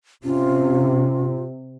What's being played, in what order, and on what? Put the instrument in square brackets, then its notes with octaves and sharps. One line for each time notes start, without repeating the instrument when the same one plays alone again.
[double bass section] C3 [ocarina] C#4 [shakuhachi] F4